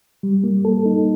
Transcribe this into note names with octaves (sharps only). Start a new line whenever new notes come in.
G3
A#3
A4
D#4